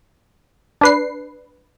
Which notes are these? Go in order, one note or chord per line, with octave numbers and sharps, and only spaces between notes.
D4 B4 C7